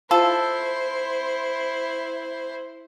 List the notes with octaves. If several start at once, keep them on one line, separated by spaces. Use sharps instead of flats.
E4 F4 A4 C5